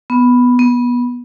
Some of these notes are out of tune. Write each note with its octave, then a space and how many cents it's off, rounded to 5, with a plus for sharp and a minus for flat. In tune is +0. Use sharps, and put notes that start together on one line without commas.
B3 +0
B3 -20